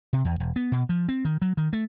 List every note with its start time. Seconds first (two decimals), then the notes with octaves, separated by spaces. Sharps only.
0.13 C3
0.25 E2
0.40 E1
0.56 B3
0.72 B2
0.89 F3
1.09 C4
1.25 D#3
1.42 F#3
1.57 D#3
1.73 A3